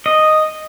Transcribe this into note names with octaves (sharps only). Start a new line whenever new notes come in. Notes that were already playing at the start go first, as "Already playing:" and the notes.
D#5